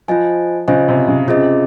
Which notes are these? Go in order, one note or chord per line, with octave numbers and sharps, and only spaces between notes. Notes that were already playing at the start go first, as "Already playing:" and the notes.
F3 F4 C5 D#5 G#5
C#3 F4 C5 D#5 G#5
C3
C#3
C3 C#4 F4 G#4 D#5